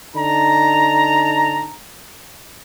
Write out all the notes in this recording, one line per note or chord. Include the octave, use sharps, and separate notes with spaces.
D3 D#4 A5 A#5